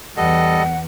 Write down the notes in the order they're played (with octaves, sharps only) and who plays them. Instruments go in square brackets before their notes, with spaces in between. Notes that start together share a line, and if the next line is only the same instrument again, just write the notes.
[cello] E2 [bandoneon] G3 A4 D#5 [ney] F#5